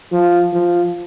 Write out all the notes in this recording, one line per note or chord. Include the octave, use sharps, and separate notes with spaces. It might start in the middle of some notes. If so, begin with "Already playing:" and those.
F3
F3